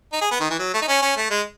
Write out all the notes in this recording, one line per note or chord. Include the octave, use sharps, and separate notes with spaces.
D#4
G#4
B3
D#3
E3
F#3
A3
D#4
C#4
C#4
A3
G#3